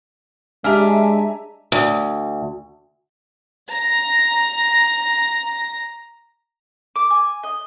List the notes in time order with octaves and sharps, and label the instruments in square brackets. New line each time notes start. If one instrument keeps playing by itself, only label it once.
[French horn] G#3 [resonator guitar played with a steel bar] D4 [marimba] G4 F6 [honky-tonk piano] E5 G#5 A#5
[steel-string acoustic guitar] D2
[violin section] A#5 A#6
[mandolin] D6
G#5
D#5